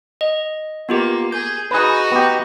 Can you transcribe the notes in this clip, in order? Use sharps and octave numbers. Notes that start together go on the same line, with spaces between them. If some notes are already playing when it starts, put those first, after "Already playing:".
D#5
A#3 B3 F4 G4
G#4 G6
D#4 F#4 G#4 B4
B3 G4